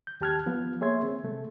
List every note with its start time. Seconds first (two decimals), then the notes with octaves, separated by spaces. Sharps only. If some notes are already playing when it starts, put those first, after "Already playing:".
0.07 G6
0.21 D#2 G4 A5 F6 F#6 G#6
0.46 F3 B3 F4
0.81 A#3 G#4 C#5 E5 C6 G#6
1.03 C4
1.24 C3 A3